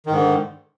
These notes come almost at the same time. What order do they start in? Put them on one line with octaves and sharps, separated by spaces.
D#3 G#2 D3